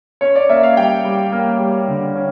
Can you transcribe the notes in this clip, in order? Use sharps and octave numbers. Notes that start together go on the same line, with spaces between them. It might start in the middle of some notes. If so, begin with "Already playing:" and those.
C#4 C#5
D5
A#3 E5
F5
G3 G5
G3
A#3
G3
D3
C#4